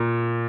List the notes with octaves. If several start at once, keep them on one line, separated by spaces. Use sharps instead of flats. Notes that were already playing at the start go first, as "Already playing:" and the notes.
Already playing: A#2